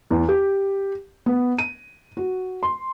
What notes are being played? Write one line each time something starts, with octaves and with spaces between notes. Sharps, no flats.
E2
G4
B3
D#7
F#4
C6